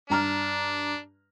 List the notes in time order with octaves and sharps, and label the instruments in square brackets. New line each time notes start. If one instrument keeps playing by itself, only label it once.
[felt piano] G2 A#5 F6 [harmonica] D4